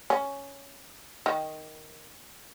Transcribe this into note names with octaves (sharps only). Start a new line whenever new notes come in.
C#4
D#3